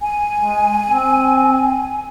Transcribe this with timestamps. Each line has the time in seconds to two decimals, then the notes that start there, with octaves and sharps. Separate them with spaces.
0.02 G#5
0.37 G#3
0.89 C4